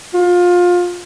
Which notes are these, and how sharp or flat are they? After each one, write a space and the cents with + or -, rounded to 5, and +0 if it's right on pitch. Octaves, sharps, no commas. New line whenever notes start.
F4 +25